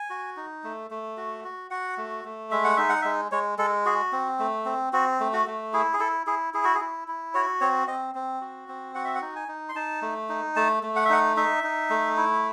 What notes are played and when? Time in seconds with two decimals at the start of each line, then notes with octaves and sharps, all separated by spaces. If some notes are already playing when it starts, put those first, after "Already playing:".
Already playing: G#5
0.10 F#4
0.37 D#4
0.64 A3
0.91 A3
1.17 F#4
1.44 F#4
1.71 F#4 F#5
1.97 A3
2.25 A3
2.51 G#3 E5
2.64 F#5
2.77 D#4 E5
2.89 F#5
3.02 G#3 E5
3.32 G#3 C#5
3.58 G#3 A4
3.85 F#4 G#4
4.12 C4
4.39 A3
4.65 C4
4.93 C4 F#4
5.20 A3
5.33 F#4
5.47 A3
5.73 E4 G#4
5.93 G#4
6.00 E4 A4
6.27 E4 G#4
6.54 E4 G#4
6.64 F#4
6.75 G#4
6.81 E4
7.08 E4
7.34 F#4 C#5
7.61 C4 C#5
7.87 C4 D#5
8.15 C4
8.41 F#4
8.68 C4
8.95 F#4 F#5
9.05 E5
9.15 F#5
9.22 D#4
9.36 G#5
9.48 D#4
9.69 C6
9.75 D#4 A5
10.02 A3
10.29 D#4
10.56 A3 A5
10.83 A3
10.96 F#5
11.05 E5
11.10 D#4 F#5
11.37 D#4 E5
11.64 D#4
11.90 A3
12.17 E4